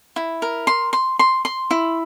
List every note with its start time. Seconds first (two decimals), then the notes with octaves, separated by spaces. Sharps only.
0.16 E4
0.42 A#4
0.67 C6
0.93 C6
1.19 C6
1.45 C6
1.71 E4